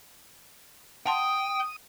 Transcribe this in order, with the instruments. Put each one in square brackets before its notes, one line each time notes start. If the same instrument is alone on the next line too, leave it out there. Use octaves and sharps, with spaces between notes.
[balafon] F#5 A5 C6 [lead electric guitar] G5 [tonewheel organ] D#6